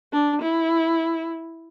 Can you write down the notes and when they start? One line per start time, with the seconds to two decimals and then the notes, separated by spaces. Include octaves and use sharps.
0.13 D4
0.42 E4